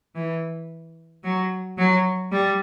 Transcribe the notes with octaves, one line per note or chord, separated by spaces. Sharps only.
E3
F#3
F#3
G3